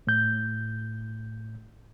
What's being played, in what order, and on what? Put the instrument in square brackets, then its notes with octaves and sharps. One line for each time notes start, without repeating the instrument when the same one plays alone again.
[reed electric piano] A2 G6